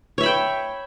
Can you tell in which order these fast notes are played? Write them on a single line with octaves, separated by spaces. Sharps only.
C#5 E5 B5 G5